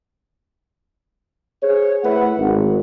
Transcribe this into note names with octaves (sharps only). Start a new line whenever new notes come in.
G#4 C5 C#5
A3 E4 G#4 B4 E5 F#5
G#1